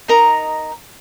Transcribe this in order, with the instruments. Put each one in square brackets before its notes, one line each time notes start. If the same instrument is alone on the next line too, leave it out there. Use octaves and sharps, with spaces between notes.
[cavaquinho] D#4 A#4 D#5 A#5